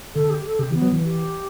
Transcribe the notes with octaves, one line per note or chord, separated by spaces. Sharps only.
D3 A4
G4
A4
C#3 G4
E3
B3
F#3
E3
G4